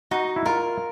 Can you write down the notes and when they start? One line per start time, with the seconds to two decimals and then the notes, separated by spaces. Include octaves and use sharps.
0.11 D#4 F#4
0.36 E4
0.46 F4 A#4